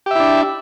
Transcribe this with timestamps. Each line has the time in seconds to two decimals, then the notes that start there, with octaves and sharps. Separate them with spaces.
0.06 G4
0.11 E5
0.15 E4
0.20 D4